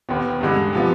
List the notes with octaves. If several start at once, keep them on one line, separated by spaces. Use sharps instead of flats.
D#2 D#3 B3
G2 D3 G#3
C3 F3 B3